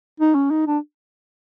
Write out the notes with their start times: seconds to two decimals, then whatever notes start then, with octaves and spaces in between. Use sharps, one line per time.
0.20 D#4
0.35 C#4
0.51 D#4
0.67 D4